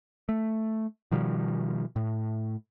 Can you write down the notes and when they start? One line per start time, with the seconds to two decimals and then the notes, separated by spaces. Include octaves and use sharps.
0.29 A3
1.11 B2 D#3 F3 G3
1.96 A2